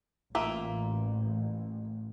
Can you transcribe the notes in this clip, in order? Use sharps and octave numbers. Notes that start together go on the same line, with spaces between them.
A1 A#3 F4 E5